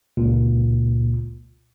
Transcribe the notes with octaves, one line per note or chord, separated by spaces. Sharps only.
G1 C#2 A#2